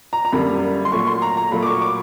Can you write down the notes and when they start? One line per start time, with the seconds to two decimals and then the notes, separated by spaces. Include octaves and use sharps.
0.13 A#5
0.25 A#5
0.32 F#2 D3 G3 A#3 B5
0.85 C6
0.92 A#2 F#3 A3 C#6
1.07 C6
1.22 A#5
1.37 A#5
1.51 A#2 F#3 A3 B5
1.63 D6
1.66 C#6
1.82 D6